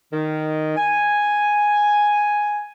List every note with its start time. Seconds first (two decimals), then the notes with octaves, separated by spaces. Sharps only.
0.12 D#3
0.77 G#5